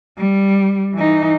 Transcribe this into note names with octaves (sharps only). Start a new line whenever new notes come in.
G3
E3 D#4